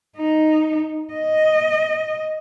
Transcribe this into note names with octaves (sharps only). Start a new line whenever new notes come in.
D#4
D#5